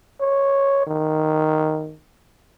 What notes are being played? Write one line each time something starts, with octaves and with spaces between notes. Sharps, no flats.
C#5
D#3